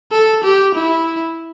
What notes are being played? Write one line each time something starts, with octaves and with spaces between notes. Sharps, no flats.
A4
G4
E4